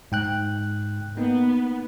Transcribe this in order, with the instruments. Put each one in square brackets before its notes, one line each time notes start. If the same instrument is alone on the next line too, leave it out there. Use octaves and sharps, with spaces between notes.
[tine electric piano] G#2 G5 F#6
[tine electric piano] A#3 D#4 [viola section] B3